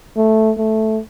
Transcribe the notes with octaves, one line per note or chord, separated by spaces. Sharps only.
A3
A3